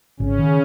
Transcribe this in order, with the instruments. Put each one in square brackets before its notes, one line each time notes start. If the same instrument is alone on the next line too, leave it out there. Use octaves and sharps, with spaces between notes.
[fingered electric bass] G#1 [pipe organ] C#3 C#4
[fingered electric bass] D#3